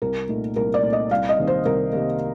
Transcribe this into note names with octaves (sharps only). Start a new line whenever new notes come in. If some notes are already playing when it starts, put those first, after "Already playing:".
C2 A#4
A#2 A3 D#4
C2 A#4
D5
A#2 A3 D#4
D#5
C2 F5
D#5
C3 D#3 G3 A#3
C5
C2 A#4
C3 D#3 G3 A#3